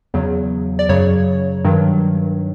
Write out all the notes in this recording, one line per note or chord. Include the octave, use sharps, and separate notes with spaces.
E2 C#3 F#3
D5
F#2 C#3 F#3 C#5
G2 D#3 F#3